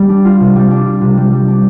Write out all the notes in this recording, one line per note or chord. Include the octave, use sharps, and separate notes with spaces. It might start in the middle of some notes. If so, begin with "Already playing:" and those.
Already playing: G3
D4
F4
C3
G3
D4
F4
C3
G3
G3
D4